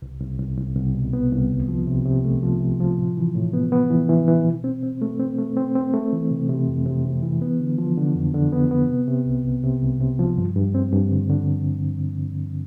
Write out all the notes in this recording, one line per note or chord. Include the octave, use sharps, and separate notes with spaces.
C2
C2
C2
C2
C2
B2
B3
C2
D2
F3
C3
C3
A3
F3
C3
F3
A2
E3
A2
B3
B3
E3
E3
E3
B2
C4
C4
A3
C4
A3
C4
C4
A3
E3
C3
C3
F2
C3
C3
E3
B3
D3
F3
D3
F2
D3
B3
B3
C3
C3
C2
C2
C3
C2
C3
F3
G2
G2
C4
G2
D3
D3